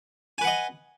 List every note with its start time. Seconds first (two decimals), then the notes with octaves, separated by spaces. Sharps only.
0.38 G#5
0.41 B4
0.44 F#5
0.47 D#5